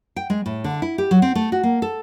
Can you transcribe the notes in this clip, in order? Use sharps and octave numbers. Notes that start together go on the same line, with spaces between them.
G5
G#3
A2
D3
E4
G4
F#3
C4
A3
F#4
A#3
A4